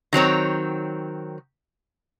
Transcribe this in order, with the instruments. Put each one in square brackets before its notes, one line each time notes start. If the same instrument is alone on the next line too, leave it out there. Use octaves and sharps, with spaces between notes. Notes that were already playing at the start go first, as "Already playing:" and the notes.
[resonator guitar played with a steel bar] D#3 F#3 C4 C#5